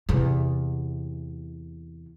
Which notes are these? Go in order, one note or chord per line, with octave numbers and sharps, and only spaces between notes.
E2 C3